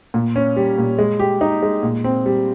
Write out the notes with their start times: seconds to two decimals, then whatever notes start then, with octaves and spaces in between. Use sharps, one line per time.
0.14 A#2
0.36 C#4
0.56 G3
0.78 A#2
0.99 G#3
1.19 G4
1.41 D#4
1.63 G#3
1.83 A#2
2.04 C4
2.26 G3